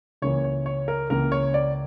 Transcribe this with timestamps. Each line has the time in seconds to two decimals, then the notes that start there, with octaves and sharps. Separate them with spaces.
0.22 C#2 C#3 E3 A#3 C#5
0.44 C#5
0.66 C#5
0.88 A#4
1.10 C#2 C#3 E3 A#3 A#4
1.32 C#5
1.54 D5